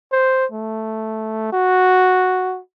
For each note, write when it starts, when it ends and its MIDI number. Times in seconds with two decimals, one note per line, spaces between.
0.12 0.46 72
0.52 1.50 57
1.53 2.60 66